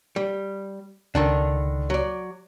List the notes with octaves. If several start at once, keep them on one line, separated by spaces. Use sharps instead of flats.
G3
C#2 D3 D#3 D4
F#3 D5